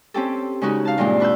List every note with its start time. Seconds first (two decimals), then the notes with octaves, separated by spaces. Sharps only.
0.14 C4 C#4 G4 A4
0.61 C#3 G#3 C#4 D#4 F#4
0.85 F5 A5
0.98 G2 A#2 E3 G#3 C4 F4
1.20 D4 B4 E6 G6